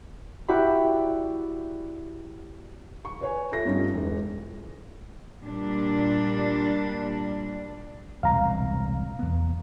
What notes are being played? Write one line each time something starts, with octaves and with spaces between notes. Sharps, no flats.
E4 F#4 G4 D5 B5
C#6
B4 C#5 G#5
F4 A4 E5 A#6
G2 G3 C#4 D#4 F4
E1
A#2 G3 D4
E1 C2 A#2 F5 A#5
E2 B3